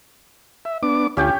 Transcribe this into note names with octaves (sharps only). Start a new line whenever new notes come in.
E5
B3 D4 D6
D2 C#4 F4 G4 G5